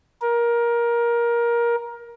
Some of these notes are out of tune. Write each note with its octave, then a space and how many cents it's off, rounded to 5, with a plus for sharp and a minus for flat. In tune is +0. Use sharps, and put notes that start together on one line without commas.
A#4 +20